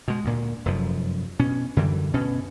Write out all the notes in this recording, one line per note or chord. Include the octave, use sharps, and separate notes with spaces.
B2 G#3
D2 A#2
F1 F#2 F3
B2 C#4
F#2 D3 E3 G3
D2 B2 C#4